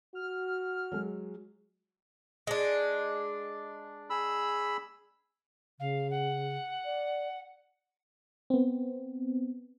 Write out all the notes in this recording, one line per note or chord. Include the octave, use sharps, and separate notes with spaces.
F#4 F6
F#3 G#3
G#3 D4
G#4 B5 E6
C#3 F5
F#5
D5
B3 C4